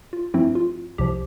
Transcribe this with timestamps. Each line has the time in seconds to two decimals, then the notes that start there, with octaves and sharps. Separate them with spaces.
0.13 F4
0.34 G2 F3 A3 C4 E4
0.55 F4
0.98 C2 C3 F3 G4